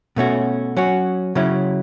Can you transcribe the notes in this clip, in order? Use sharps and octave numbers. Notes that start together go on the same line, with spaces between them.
B2 A3 C#4 F#4
F#3 C#4 F#4
C#3 F#3 C#4 E4